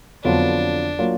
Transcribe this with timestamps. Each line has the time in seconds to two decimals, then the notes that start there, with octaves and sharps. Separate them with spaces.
0.24 F2 D3 F#3 B3 D4 F4
0.99 F#3 A#3 F4